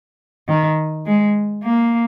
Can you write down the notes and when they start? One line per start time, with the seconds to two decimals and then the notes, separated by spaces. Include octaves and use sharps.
0.49 D#3
1.06 G#3
1.64 A#3